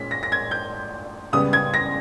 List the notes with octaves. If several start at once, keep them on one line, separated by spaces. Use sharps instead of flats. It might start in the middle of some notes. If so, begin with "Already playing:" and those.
Already playing: A#2 G#3 C#4 B6
A#6
A#6
G#6
G6
C#2 C#3 G3 B3 D#6
G#6
A#6